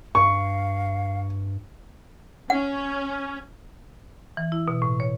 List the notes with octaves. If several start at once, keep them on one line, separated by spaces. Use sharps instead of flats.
G2 F5 C#6
C#4 F#5
E3
E4
B2
A2
C#5